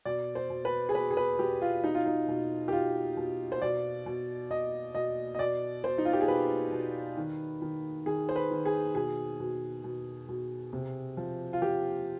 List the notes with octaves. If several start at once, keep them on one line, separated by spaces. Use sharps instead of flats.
B2 D5
C5
B2
B4
G#4
B2 B4
G#4
B4
B2 G4
F4
B2 D#4
F4
D#4
B2
G4
B2 F4
B2
C5
B2 D5
B2
B2 D#5
B2 D#5
D#5
B2 D5
B2 C5
D#4
F4
G4
G#4
B2 B4
B2
D#3
D#3
D#3 G#4
C5
B4
D#3
G#4
B2 G#4
B2
B2
B2
C3
F3
F4
F3 G4